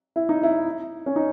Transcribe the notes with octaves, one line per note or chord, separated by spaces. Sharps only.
E4
D#4
E4
C#4
D#4